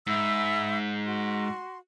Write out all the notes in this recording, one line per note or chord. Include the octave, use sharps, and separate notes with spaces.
G#2 E5 B5 E6
F#4 C6